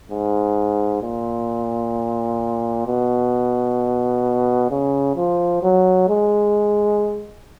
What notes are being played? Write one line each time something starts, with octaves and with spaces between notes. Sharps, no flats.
G#2
A#2
B2
C#3
F3
F#3
G#3